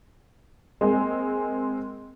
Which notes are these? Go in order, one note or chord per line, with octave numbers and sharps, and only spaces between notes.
G#3 A#3 C4 G#4